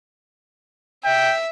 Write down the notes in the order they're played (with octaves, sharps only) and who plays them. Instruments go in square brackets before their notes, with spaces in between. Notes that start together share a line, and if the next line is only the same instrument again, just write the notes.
[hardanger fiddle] E5 [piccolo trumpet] G5